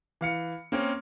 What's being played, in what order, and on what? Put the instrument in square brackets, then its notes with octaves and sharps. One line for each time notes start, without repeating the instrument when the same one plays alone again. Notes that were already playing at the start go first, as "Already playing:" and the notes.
[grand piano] E3 F5 C#7
A#3 C4 C#4